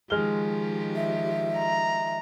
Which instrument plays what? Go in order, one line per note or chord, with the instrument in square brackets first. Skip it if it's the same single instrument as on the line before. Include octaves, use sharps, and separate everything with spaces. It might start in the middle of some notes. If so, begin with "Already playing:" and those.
[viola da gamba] D#3 F3 G4 [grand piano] G#3 F6 G7
[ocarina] E5
[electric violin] A#5